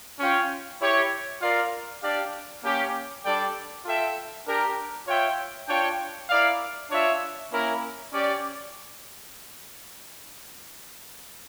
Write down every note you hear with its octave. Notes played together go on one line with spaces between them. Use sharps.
C#4 F4 C#5 G5
E4 G4 C#5
F4 A#4 D5 F5
D4 G4 D5 F5
A#3 C#4 G4
G3 D4 A4 D5 G5
F4 A4 E5 G5
D4 G4 A#4
F4 C#5 E5 G5
D4 F4 C#5 G5
E4 A#4 D5 F5
D4 F4 C#5 E5
A#3 C#4 E4 A#4
C#4 G4 D5